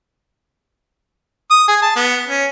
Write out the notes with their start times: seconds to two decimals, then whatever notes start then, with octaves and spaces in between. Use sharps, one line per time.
1.51 D#6
1.68 G#4
1.82 A5
1.96 B3
2.28 C#4